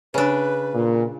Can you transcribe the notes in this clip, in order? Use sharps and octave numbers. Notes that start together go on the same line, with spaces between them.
C#3 D4 B4
A#2